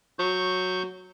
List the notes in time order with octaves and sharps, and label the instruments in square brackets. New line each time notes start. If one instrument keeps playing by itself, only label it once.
[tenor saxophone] F#3 [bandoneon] C#6 G6